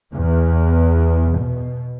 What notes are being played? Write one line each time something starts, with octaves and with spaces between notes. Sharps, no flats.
E2
B2